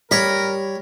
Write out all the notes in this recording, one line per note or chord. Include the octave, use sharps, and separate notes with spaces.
G3 A#4 C#5 B5